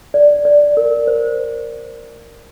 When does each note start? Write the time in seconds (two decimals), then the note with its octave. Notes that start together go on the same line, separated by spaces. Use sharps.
0.14 D5
0.45 D5
0.77 A#4
1.07 C5